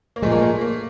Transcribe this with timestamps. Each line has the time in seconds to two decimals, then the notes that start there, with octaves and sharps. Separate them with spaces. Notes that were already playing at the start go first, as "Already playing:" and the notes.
0.16 A#3
0.22 A#2 F3 G#3 A3
0.32 A#3
0.42 A#3
0.61 A#3